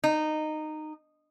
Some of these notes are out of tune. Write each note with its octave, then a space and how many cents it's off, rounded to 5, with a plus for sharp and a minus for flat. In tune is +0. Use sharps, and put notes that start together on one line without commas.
D#4 -15